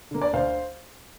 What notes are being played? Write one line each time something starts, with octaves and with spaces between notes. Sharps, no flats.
D3 A#3
D5
D2 C5 F5